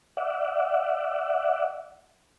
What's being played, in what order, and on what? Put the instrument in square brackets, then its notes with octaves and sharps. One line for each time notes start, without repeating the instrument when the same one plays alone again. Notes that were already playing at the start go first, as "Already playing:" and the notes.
[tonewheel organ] D5 E5 F#5